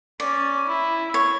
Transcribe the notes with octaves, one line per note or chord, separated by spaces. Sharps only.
C#4 D5
E4
C#5